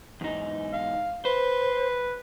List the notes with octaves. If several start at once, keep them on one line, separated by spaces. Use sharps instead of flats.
E2 G#2 D#4
F5
B4 C5